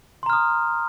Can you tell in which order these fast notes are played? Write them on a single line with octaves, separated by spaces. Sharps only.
C6 A#5 F6 D#6